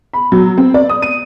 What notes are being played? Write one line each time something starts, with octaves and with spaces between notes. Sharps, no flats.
B5
F#3
C4
D5
D#6
D#7